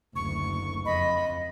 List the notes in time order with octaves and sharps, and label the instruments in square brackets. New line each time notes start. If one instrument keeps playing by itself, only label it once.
[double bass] F#1 D2 [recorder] C#6
[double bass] F2 [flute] D#5 [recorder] B5